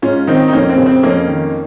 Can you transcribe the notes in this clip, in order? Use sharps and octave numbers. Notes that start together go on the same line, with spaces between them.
G#2 C#4 F4
D#3 C4 D#4
D#4
F2 A#3 C#4
C4
C#3
C4
F2 A#3 C#4
D#3